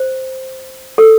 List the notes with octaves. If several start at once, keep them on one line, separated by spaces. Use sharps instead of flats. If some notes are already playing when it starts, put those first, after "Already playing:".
Already playing: C5
A4